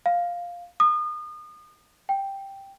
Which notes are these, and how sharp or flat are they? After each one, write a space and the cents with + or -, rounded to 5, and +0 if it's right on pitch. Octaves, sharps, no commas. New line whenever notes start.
F5 +5
D#6 -35
G5 +0